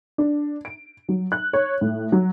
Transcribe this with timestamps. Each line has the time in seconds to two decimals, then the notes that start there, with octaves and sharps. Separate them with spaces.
0.18 D4
0.65 D7
1.09 F#3
1.32 F#6
1.53 C#5
1.81 A2
2.12 F#3